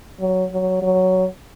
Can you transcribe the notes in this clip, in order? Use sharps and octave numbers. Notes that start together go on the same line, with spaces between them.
F#3
F#3
F#3